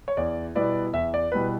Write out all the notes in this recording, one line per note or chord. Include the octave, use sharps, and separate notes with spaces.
C#5
E2 D5
B2 G3 B3 E4 D5
E2 E5
D5
B2 G3 B3 E4 B4